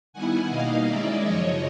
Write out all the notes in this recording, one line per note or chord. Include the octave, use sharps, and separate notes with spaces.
D#3 G3 B3 E4 F#5 G#5
B2 G3 A#3 D#4 D#5 F5
D#3 G#3 C#4 E4 D5 E5
F#2 C#3 F3 C#5 D#5